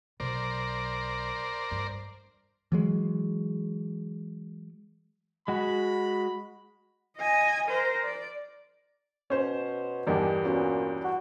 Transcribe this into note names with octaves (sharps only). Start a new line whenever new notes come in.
B1 A#4 C5 D5
G2
E3 F#3 G#3
G#3 F#4 B5
D#5 G#5
A#4 C5
D5
B2 C#4 C5
E2 G2 D#3 D4 G4 A#4 G#5
A#2 B3 C#4 F#4
F#4